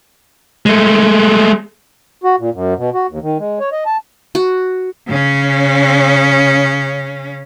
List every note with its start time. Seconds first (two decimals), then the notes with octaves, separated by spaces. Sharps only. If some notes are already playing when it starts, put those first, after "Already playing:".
0.66 G#3 A3
2.24 F#4
2.39 A#2
2.54 F#2
2.78 B2
2.94 F#4
3.09 D#2
3.22 D#3
3.39 G#3
3.60 C#5
3.72 D#5
3.86 A5
4.35 F#4
5.08 C#3 C#4